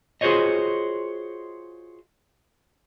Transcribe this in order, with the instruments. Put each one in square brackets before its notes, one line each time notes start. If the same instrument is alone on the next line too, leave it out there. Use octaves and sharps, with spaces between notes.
[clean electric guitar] F4 F#4 G#4 C5 C#5 D#5